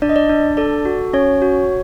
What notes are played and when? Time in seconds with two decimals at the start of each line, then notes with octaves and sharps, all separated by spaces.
0.02 D4 D5
0.09 D#5
0.16 D5
0.30 D4
0.57 A4 D5
0.85 F#4
1.13 C#4 C#5
1.42 F#4